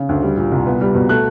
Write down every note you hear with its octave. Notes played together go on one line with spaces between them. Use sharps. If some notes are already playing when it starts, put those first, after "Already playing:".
Already playing: C#3
D2
G3
A#2
C2
B3
G3
B2
A3 F#6